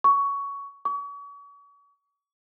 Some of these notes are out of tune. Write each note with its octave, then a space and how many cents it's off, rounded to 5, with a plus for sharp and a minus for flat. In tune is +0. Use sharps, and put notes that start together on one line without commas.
C#6 +15
C#6 +40